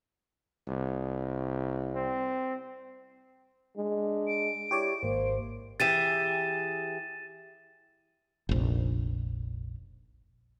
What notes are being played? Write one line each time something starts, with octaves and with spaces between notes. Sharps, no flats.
C2
C4
G#3 D4
D7
E4 G4 C#5 D5
G#1 A#3 C5
E3 G4 G#4 A6 D#7 E7
F1 A#1